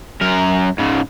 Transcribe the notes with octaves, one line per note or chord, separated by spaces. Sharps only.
F#2 A#4
G#2 C#3